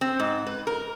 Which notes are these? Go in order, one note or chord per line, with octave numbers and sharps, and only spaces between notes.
C4
G#2
B4
A#4